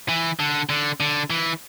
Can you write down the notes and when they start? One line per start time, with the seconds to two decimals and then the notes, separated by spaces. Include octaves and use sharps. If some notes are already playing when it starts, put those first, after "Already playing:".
0.09 E3
0.40 D3
0.69 D3
1.00 D3
1.30 E3